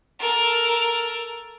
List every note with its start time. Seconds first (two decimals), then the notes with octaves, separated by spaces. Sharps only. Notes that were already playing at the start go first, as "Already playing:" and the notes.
0.19 A4 A#4